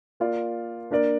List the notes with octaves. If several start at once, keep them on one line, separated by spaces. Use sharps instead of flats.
A#3 F4 D5
A#3 D4 A#4 D5